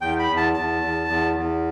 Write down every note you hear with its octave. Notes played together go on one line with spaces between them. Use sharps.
E2 G5
B5
E2
A5
E2 A5
E2
E2
E2